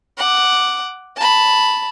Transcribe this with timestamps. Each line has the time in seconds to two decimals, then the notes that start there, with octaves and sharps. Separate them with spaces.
0.18 F#5 D6
1.17 A5 B5